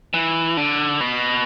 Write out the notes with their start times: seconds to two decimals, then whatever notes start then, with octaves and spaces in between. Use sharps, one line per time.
0.14 E3
0.57 D3
1.01 B2